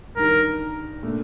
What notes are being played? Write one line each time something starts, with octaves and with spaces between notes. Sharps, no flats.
G2 D#3 G3 A#4
A#2 A3 D4